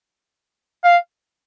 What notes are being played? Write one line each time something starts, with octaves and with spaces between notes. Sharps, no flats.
F5